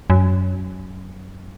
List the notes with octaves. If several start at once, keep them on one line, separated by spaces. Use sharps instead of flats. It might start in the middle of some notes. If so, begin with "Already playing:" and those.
F#2